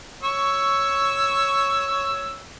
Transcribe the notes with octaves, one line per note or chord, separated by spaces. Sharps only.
C#5 C#6 E6